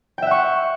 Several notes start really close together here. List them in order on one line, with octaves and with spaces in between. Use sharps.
G5 E5 F#5 C#6